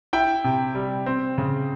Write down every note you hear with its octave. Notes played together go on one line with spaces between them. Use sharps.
E4 G5
C3
G3
C4
C#3